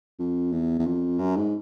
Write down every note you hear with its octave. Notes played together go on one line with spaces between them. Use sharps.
F2
E2
E2
F2
F#2
G#2